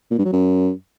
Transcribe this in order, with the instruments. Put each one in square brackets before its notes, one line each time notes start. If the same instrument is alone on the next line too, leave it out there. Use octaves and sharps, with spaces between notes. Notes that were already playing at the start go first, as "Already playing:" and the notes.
[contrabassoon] A#2
G2
F#3
F#2